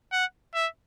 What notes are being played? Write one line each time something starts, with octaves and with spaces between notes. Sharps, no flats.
F#5
E5